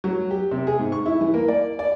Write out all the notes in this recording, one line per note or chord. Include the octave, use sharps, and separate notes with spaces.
F#3
G4
C3
G#4
G#2
C#6
E4
E3
A#3
D5
D5